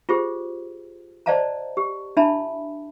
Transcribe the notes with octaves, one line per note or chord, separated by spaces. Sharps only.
F4 G4 G#4 C5
C5 D5 D#5 F5 A5 A#5
G4
D4 E4 E5 A5 B5